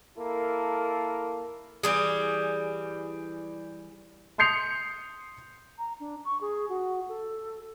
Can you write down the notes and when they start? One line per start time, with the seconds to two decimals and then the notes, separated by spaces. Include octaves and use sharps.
0.18 A#3 E4 A4 A#4
1.83 E3 G3 G#4
4.38 C6 D#6 G6 C7 C#7 F7
5.78 A#5
6.00 D4
6.25 C#6
6.41 G#4
6.69 F#4
7.08 A4